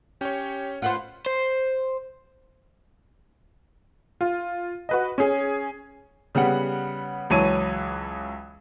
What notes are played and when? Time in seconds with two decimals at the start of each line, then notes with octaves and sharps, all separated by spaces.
0.21 C#4 G4 C#5
0.82 F4 B4 C5 F#5
1.26 C5
4.21 F4
4.89 F#4 B4 D#5
5.18 C#4 G#4
6.35 C#3 G3 B3 F#5
7.30 C#2 E3 F#3 C#5 A5 D#7